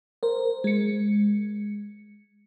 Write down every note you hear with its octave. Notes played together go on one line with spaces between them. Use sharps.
A#4 C5
G#3 C#7